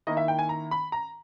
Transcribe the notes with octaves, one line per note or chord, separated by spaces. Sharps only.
D#3 A#3 E4 D#5
E5
G5
G#5
A#5
B5
A#5